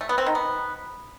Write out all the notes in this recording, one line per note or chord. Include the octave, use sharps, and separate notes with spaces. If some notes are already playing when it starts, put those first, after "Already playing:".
A3
B3
C4
D#3
B3